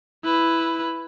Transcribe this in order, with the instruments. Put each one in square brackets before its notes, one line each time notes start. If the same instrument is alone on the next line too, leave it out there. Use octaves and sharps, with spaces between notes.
[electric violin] E4 B4